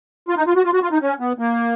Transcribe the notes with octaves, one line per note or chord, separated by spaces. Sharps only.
F4
D#4
F4
F#4
F4
F#4
F4
D#4
C#4
B3
A#3